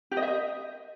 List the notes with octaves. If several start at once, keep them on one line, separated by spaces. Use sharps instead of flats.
G4
D#5
E5
D#5